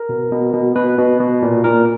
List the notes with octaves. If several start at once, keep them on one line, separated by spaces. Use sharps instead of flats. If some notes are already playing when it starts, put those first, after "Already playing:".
Already playing: A#4
B2
B2
B2
B2 B4
B2
B2
A#2
A#2 A#4